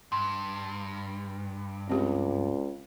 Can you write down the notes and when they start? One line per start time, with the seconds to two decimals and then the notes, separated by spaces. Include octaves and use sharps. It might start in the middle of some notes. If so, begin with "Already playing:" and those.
0.12 G2 C6
1.89 C#2 C4 G4